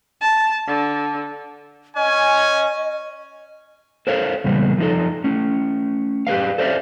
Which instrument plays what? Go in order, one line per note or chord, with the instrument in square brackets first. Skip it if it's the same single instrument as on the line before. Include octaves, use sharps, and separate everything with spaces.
[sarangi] A5
D3
[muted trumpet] C#4 [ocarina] D#5 [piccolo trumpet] G#5
[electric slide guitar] A4 A#4 C5 C#5 F5
E2 A#2 C#3 G3 G#3 B3
F3 D#4 A4
A3 C#4
G4 G#4 B4 F5
A4 C5 D5 E5 F5